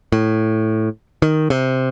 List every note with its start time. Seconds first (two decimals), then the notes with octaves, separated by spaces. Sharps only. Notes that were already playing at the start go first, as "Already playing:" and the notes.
0.12 A2
1.22 D#3
1.50 C3